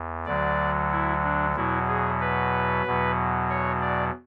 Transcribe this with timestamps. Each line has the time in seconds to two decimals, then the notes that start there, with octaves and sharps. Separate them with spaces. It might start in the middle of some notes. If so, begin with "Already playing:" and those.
Already playing: E2
0.26 D2 D3 F#3 D5
0.92 E4
1.24 D4
1.55 E2 B2 F#3 E4
1.88 G#4
2.21 B4
2.86 E2 B2 F#3
3.50 C#5
3.82 D5